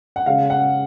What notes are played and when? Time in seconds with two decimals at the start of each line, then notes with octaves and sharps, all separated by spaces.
0.16 F#5
0.26 C#3 G#3 F5
0.50 F#5